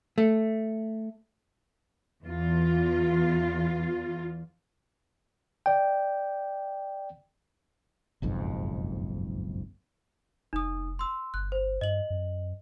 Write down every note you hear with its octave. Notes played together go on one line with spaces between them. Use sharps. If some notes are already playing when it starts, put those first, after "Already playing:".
A3
E2 F4
D5 G5
F#1 B1 F2 G#2
F1 D#4 D#6
C6 E6
G1 F#6
C5
G2 D#5 F#7
F#2